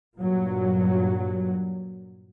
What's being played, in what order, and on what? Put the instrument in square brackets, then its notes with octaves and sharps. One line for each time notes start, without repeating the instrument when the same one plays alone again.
[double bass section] G2 A#2 F#3